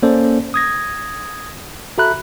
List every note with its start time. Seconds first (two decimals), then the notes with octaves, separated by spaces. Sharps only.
0.03 A#3 C#4 A4 C5 D5
0.54 D#6 G#6 A#6
1.98 F#4 A4 E5 A#5 B5 F#6